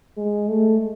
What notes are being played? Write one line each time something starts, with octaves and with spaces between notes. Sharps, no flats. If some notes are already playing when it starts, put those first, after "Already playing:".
G#3
A3